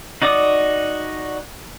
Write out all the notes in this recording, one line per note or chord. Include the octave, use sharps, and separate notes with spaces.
D#4 F#4 D5 D6 D#6